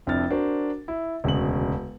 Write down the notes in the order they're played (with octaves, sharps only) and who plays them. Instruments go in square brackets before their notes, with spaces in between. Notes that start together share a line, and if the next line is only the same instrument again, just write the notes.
[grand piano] F1 F2 D4 E4 F6 A6
D4 F#4 A#4 C5
E4
E1 D2 C#3 F#7